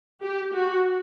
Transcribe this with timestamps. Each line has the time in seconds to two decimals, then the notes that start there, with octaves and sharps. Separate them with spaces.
0.21 G4
0.53 F#4